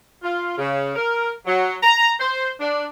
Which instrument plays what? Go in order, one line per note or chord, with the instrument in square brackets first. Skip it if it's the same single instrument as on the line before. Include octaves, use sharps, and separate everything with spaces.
[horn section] F4
C#3
A#4
F#3
A#5
C5
D4